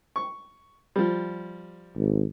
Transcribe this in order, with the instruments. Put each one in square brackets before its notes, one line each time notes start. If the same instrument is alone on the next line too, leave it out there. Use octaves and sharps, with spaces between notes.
[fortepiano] C#6
F3 G3
[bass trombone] G#1